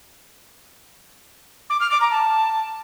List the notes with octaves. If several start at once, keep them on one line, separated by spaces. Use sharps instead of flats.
D6
F6
D6
A#5
A5